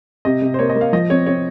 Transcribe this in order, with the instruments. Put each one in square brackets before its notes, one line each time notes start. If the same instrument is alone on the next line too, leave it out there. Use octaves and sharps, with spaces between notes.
[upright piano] C3 [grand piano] D#5
[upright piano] C3
[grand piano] C5
[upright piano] A#3 [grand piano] C#5
[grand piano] D#5
[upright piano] A#3
[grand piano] F5
[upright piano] F3 [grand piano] D#5
[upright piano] C4 [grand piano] C#5
[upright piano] C4 [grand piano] C#5